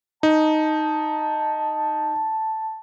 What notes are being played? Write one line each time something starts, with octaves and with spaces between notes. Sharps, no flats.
D#4 A5